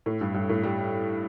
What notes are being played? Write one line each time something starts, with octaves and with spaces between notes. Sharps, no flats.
A2
G2
G2
A2
G3